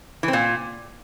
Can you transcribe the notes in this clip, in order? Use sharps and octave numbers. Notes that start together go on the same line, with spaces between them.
E3
C4
A#2